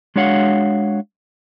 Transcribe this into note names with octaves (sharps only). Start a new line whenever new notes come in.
G#3 D4 F#4 C#5 F5 F#5